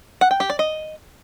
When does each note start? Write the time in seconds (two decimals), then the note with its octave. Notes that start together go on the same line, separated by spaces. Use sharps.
0.21 F#5
0.31 G5
0.40 G4
0.50 D5
0.59 D#5